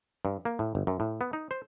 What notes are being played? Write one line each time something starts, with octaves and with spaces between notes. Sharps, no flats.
G2
A#3
A2
G1
F#2
A2
B3
D#4
C5